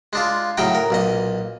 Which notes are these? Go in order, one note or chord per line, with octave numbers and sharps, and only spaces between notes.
G#3 D4 F4
A2 C#3 F#3 D#4 G5 A#5
A#4
B1 A#2 D#5